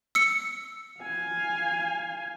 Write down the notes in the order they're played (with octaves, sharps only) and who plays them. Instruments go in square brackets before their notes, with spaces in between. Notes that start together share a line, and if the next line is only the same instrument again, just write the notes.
[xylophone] E6 C#7
[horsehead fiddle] F5 G#5